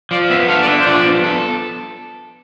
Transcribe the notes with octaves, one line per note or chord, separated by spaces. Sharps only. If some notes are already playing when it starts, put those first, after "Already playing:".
F3 D5
B3 E5
A4 F5
D5
D4 E5
C5
F3 D5
B3
A4